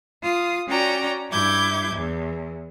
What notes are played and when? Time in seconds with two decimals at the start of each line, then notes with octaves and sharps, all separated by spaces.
0.23 F4 D#6
0.67 C#4 F#4 D5 G5 A#5
1.30 G2 E4 D6 G6 G#6
1.94 E2